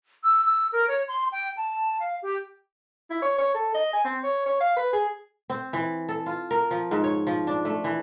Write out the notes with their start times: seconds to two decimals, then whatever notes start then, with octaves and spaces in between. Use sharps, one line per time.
0.24 E6
0.45 E6
0.72 A#4
0.88 C#5
1.08 C6
1.32 G5
1.57 A5
2.00 F5
2.22 G4
3.10 E4
3.22 C#5
3.38 C#5
3.54 A4
3.74 D#5
3.93 G#5
4.04 C4
4.23 C#5
4.46 C#5
4.60 F5
4.76 B4
4.93 G#4
5.50 C4
5.73 E3
6.09 A4
6.26 F4
6.51 A#4
6.71 F3
6.91 G#2
7.04 C#5
7.27 F3
7.47 D4
7.65 A3
7.84 E3